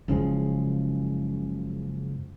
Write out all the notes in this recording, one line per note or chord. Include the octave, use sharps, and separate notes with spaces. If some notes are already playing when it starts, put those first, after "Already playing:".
F#1 C#3 F3 G#3